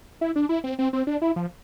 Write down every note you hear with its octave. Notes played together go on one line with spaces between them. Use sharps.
E4
D4
E4
C4
C4
C4
D4
E4
F3